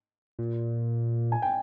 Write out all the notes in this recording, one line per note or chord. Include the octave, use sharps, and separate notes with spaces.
A#2
G#5
G5